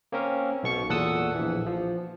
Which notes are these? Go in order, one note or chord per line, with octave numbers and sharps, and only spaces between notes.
A#3 C4 C#4 A#4
B1 B2 C#6 C#7
E2 A#2 A4 F#5 D#6 E6
A#1 E3
F3